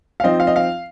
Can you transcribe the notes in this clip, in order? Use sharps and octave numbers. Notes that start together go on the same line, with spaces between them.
F5
F3 C4 D#4 D#5
F5
D#5
F5